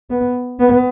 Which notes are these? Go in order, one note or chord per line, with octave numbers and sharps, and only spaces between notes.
B3
B3